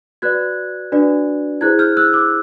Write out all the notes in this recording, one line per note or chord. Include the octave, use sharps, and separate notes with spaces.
F#4 B4 D5 F#6 G#6
D4 F#4 B4 D5
E4 G#4 C5 F#6 G#6
F6 G6
E6 F#6
D6 E6